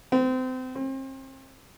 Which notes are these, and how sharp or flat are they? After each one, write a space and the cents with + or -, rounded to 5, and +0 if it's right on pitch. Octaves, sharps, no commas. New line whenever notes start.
C4 -30
C4 +35